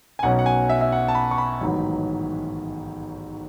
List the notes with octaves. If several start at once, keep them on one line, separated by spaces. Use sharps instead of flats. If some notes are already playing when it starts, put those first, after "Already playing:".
G#5
B1 B2 F#3 C#4 F#5
F#5
G#5
E5
E5
F#5
A5
B5
C#6
B5
A1 G#2 D#3 F#3 B3